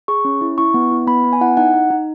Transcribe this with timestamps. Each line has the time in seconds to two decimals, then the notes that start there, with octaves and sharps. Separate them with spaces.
0.08 G#4 C#6
0.25 C#4
0.41 E4
0.58 E4 C#6
0.74 B3
0.92 E4
1.07 B3 B5
1.24 B3
1.33 G#5
1.41 E4 F#5
1.57 D#4 F#5
1.74 D#4
1.90 D#4